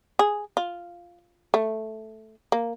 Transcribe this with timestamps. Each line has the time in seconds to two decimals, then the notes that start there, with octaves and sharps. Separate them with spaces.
0.19 G#4
0.57 F4
1.54 A3
2.52 A#3